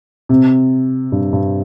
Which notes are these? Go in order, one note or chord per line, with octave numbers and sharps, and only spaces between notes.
C3
G2
G2